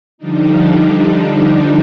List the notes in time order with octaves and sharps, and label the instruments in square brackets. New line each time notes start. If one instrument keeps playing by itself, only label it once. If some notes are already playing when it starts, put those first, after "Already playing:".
[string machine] D3 F3 G3 D4 D#4